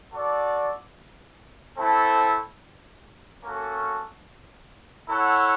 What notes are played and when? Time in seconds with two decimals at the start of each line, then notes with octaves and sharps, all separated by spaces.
0.13 F#4 A4 D5
1.78 A3 C4 E4 A4
3.43 A#3 C#4 F#4 A4
5.08 E4 A4 C#5 F#5